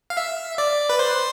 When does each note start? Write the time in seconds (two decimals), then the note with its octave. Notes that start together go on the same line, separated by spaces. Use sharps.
0.10 F5
0.17 E5
0.58 D5
0.89 B4
0.99 C5